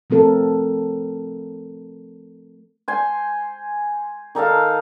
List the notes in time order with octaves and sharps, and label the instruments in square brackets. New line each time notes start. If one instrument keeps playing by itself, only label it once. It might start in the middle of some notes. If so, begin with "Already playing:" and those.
[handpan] F3 A3 C4 A4 A#4
[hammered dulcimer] C5 G#5
D#3 D#4 A4 F5